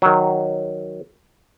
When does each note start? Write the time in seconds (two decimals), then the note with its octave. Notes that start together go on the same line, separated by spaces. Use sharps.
0.02 D#3 F#3